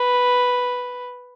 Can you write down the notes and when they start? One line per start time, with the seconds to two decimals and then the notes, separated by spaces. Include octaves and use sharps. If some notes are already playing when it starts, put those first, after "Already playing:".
Already playing: B4